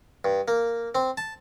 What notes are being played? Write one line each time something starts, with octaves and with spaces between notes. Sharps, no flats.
G2
A#3
C4
A5